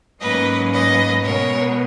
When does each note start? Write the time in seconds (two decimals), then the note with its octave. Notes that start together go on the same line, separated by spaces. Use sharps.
0.21 G#2 F#3 A#3 C#4 B4 D#5
0.72 B4 D#5
1.23 B2 G#3 B3 A#4 C#5